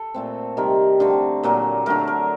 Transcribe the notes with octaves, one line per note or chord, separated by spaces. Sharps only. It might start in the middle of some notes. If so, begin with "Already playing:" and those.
Already playing: A4
A#2 A3 C4
C3 D#3 G3 C4 A#4
D3 A3 C4
A#2 F#3 A#3
D3 F#3 A3 A#4
A#4